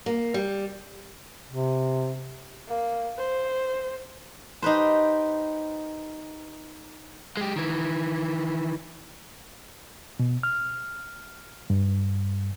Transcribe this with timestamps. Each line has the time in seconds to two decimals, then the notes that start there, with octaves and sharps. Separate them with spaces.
0.06 A#3
0.34 G3
1.48 C3
2.68 A#3
3.18 C5
4.62 D#4 G4 B4 C5
7.37 G#3 G4
7.56 D#3 E3
10.20 B2
10.43 F6
11.70 G2